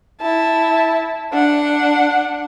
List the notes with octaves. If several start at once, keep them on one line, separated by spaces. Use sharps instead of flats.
E4 A5
D4 F#5